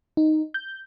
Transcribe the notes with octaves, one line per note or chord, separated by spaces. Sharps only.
D#4
G6